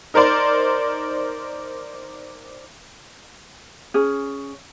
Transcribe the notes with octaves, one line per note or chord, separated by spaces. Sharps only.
D#4 A#4 C5 D5 C6
C#4 G#4